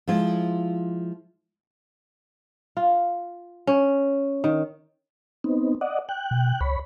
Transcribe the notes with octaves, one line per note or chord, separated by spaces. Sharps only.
F3 G#3 E4 F4
F4
C#4
D#3
B3 C4 D#4
D5 D#5 F#5
G5 F#6
B2
C#2 C#5 B5